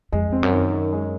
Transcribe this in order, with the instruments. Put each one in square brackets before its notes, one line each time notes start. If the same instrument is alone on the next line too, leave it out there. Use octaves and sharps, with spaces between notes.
[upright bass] F2 [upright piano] G#3
[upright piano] C4
[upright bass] F#2
[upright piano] D#3
D#3
G#3